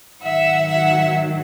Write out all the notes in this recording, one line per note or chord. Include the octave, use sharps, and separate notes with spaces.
G#2 D#3 F#3 E5 F#5
E5 F#5